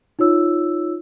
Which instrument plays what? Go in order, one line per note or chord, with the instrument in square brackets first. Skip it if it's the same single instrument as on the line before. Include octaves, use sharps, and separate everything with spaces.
[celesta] D#4 F4 C#5 E6